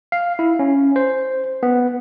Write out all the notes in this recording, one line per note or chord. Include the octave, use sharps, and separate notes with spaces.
F5
E4
C#4
C5
B3